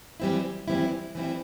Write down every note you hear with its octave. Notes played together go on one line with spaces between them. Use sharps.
E3 G3 C4 E4
E3 G3 C4 E4
E3 G3 C4 E4